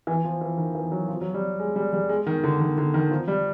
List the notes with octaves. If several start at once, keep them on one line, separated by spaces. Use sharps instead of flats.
E3
F3
E3
D#3
E3
F#3
F3
F#3
G3
G#3
G3
G3
G#3
D#3
D3
D#3
D3
D#3
F3
G3